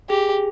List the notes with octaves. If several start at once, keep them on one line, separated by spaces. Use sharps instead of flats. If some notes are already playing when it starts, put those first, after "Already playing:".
G4 G#4